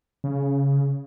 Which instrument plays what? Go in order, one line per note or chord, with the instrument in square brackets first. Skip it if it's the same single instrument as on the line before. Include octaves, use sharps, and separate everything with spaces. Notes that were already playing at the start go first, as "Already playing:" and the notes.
[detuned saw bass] C#3